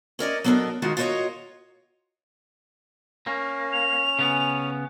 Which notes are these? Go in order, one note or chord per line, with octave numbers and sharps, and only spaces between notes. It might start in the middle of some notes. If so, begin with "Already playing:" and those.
C#4 A#4 D5 D#5
F#3 B3 D4 A4 A#4 D#5
D#3 G#3 D#4 F4 F#4
F4 F#4 A#4 C5 C#5 D#5
A#3 C#4
F7
C#3 B3